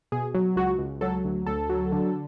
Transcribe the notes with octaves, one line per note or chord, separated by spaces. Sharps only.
B2 G#4
F#3
C#2 F#4
C#2
F#3 A4
D2
D2 A4
F#3
D3